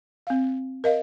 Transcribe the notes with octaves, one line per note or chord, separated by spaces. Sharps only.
C4 F5
A#4 D#5 F5